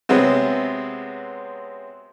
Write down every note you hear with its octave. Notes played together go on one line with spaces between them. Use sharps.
C3 F#3 G#3 B3 C4